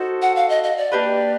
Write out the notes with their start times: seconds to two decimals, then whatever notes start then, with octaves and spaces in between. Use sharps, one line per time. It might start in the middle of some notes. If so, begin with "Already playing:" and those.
Already playing: D#4 F#4 A4 C5
0.22 F#5
0.36 F5
0.49 D#5
0.64 D#5
0.78 D5
0.92 A#3 D4 G4 B4